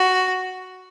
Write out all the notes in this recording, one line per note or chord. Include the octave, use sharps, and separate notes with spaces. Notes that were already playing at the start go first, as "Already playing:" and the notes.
Already playing: F#4